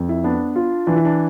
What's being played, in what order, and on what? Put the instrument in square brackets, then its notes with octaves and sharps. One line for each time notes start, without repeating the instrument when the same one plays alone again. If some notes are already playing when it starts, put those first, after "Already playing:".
Already playing: [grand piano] F2
[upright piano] E4
[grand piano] B3 [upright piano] D4
[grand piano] F4
[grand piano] E3 [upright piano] D4
[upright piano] E4
D4